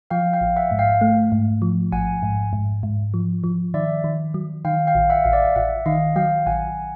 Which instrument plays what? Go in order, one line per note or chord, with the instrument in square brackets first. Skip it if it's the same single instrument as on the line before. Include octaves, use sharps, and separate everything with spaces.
[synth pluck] F3 [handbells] F5 G5
[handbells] F5 G5
[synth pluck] A1
[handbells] E5 F#5
[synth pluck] G#2
[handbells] F5 G5
[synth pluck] A3
G#2
F3
[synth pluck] A1 [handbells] F#5 G#5
[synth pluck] G#2
G#2
G#2
F3
F3
[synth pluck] D#3 [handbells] D5 E5
[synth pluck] D#3
F#3
[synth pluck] D#3 [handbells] F5 G5
[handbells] F5 G5
[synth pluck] A1
[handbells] E5 F#5
[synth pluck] A1 [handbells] F5
[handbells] D5 E5
[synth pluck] A1 [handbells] E5 F#5
[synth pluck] D#3 [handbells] D#5 F5
[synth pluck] F#3 [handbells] F5 G5
[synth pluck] A1 [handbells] F#5 G#5